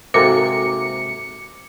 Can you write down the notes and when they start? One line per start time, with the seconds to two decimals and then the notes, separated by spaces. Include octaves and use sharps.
0.14 G#2 C3 A#3 F#4 A4 A#4 D6 C#7